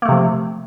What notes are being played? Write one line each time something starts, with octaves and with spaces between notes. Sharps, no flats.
C3 F3 A3 A#3